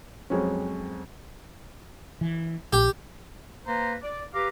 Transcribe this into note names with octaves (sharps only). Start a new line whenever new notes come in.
F2 F#3 G#3 C4 C#4
E3
A#1 G4
A#3 B4 C5 A#5
D5
G4 B4 F5 A#5 D6